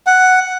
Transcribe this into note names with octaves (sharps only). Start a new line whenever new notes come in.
F#5